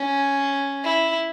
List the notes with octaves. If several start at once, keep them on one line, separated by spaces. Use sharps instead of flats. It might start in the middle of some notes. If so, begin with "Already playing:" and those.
Already playing: C#4
E4